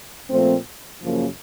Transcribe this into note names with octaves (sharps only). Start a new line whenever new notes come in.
A#2 F3 A3 C4
F#2 C#3 F3 A#3